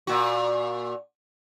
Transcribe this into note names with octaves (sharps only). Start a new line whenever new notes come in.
A#2 F#4